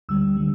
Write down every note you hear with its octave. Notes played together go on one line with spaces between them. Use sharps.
D2 D3 G3 E6
D3 G3